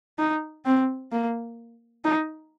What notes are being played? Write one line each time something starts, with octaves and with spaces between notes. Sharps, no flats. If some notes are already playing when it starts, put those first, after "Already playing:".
D#4
C4
A#3
D#4